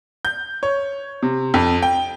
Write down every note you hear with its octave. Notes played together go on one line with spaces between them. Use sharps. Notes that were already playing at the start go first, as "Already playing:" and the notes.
G6
C#5
C3
F2
G5